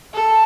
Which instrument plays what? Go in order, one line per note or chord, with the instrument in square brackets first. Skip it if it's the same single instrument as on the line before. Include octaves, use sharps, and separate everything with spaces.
[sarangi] A4